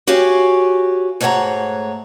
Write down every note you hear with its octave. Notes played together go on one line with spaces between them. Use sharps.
F#4 G4 C#5 F5 G#5
G#2 A3 C#5 F5 F#5 A#5